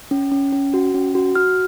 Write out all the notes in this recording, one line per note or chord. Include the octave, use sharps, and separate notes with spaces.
C#4
C#4
C#4
F#4
C#4
F#4
F#4 F6